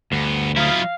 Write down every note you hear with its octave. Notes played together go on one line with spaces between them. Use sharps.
D2 G2 B3
F#3 E4 F4 D#5 F5